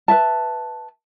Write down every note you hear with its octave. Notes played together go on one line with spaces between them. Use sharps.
B4 E5 A5